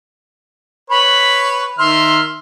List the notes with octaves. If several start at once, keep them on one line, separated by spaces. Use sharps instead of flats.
B4 C#5 B5
D#3 E5 C6 F6